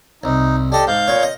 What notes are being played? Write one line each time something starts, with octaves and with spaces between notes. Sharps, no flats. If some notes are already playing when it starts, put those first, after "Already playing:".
C2 D#4
D4 G4 A4 D#5
G#2 F5 G6
A#2 C#5
D#5